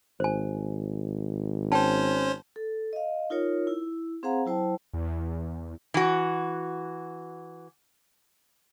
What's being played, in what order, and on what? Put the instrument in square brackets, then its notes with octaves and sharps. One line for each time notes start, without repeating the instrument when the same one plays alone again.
[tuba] G#1 [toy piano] C5 G#5
[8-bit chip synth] C#4 C5 [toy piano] G5 A5
[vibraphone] A4
D#5 F5
D#4 F4 A#4 C#5
E4
C4 G#4 C5 F5 F#5 A#5
F#3 E4 C5 G5 A5
[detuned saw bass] E2
[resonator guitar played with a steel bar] E3 F#4